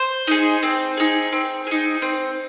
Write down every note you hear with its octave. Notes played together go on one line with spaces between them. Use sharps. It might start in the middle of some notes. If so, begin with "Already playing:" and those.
Already playing: C5
D#4 G#4
C4
D#4 G#4
C4
D#4 G#4
C4